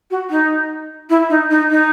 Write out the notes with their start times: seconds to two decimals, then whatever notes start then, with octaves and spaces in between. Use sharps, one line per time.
0.11 F#4
0.30 D#4
1.10 E4
1.30 D#4
1.50 D#4
1.71 D#4